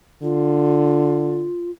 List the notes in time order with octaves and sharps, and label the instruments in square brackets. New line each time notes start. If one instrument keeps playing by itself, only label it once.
[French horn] D3 [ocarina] F4